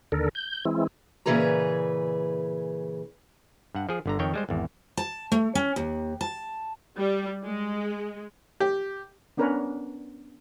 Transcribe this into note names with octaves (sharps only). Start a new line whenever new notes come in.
D#2 D3 A4 A#4
G6
E3 G#3 C4 E4
A#2 C#3 E3 G#4 B4 A#5
G2 F#5
F3 G#4
G1 D3 A#5
F2 D#3 C#5 G5
G3 G#3 C5
G#1 E2
A5
A3
C#4
D#2
A5
G3
G#3
G4
B3 C#4 D4 A#4 B4 C#5